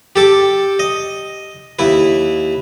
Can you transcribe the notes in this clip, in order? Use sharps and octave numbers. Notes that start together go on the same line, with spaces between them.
G4 A4 D6
D#5
D#2 E4 B4